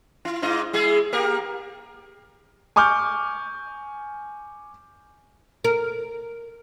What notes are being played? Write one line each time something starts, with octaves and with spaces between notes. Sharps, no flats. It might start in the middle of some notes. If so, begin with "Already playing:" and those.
E4
G#2 E4 D#5
G#3 E4 G#4
A#3 G4 A#4
G#5 C#6 D6 F6 G6
A#4